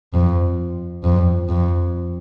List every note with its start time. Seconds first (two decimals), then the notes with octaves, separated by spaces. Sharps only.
0.14 F2
1.04 F2
1.49 F2